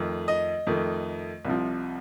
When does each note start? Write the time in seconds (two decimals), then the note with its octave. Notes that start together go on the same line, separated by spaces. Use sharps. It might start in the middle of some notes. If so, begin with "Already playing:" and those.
Already playing: F2 D#3 A3
0.28 D#5
0.67 F2 D#3 A3
1.45 C2 C3 F3